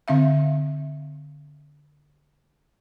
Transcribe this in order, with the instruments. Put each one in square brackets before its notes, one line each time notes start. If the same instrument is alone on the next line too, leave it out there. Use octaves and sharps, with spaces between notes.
[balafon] D3 C4 E5 F5